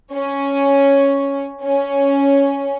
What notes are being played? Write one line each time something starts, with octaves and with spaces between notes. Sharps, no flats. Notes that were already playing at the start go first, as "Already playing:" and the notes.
C#4
C#4